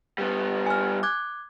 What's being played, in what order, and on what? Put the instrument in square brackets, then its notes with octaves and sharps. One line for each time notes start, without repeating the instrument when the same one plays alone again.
[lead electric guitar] G3 B3
[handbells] G#5 F6
D6 F#6 G#6